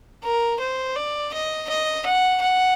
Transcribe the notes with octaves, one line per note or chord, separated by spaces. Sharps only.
A#4
C5
D5
D#5
D#5
F#5
F#5